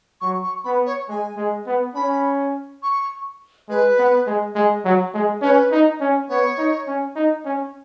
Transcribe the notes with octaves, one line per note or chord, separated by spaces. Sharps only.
F#3 C#6
C#6
B3 B5
C#5
G#3 G#5
G#3
B3
C#4 B5
C#6
G#3 B4
B3
G#3
G#3
F#3
G#3
C#4 B4
D#4
C#4
B3 C#5
D#4
C#4
D#4
C#4